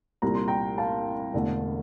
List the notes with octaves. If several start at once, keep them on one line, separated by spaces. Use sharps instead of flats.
C2 A#2 G3 A#5
C6
G5 A#5
F5 A5
E1 E2 D3 A3